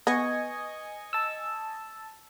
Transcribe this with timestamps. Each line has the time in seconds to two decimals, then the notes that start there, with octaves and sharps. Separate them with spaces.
0.07 B3 D#5 G#5 C#6
1.13 A5 E6